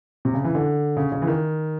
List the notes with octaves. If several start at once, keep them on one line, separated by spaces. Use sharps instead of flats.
C3
C#3
E3
D3
C#3
C#3
E3
D#3